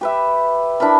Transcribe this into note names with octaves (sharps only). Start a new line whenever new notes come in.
G4 B4 E5
D4 E4 A#4 B5